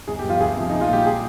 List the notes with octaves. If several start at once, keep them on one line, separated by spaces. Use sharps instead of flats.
G1 G#4
G4
G2
F3 F4
D2 G#4
C3 F3
A#1 D#4
F4
A#2 G3 G4
G#4